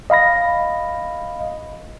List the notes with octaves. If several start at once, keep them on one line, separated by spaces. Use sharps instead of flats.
D#5 F5 B5 A#6